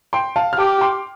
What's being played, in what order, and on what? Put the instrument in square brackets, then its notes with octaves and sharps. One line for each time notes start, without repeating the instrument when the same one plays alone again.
[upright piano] G5 C6
F5 A5
F6
[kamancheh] G4 [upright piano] A5 D6
[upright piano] G5 C6